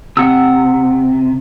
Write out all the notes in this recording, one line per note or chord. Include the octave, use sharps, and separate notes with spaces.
C3 F#5 E6